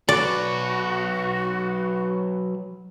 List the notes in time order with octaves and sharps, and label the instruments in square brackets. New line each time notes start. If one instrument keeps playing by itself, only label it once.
[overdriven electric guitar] F#3 B4 [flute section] F#4 [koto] D5